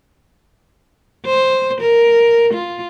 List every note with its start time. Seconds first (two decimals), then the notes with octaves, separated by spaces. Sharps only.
1.26 C5
1.81 A#4
2.54 F4